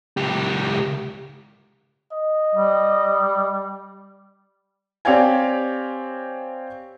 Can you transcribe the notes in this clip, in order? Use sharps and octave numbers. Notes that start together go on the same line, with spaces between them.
C#2 G4
D#5
G3
C4 G4 C#5 D5 F5 G#5